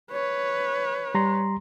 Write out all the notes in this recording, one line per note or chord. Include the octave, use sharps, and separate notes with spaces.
B4 C#5
G3 A#5 C6